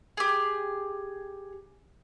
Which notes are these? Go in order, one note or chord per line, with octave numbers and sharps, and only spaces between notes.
G4 G#4